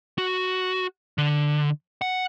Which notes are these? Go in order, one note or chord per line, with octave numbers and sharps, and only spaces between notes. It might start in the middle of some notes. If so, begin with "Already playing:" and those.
F#4
D3
F#5